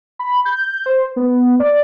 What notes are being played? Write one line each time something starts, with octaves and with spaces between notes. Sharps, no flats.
B5
G6
C5
B3
D5